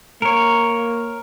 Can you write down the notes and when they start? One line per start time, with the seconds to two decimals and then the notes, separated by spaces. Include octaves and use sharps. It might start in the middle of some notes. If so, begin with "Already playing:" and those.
0.22 A#3 A#4 C#5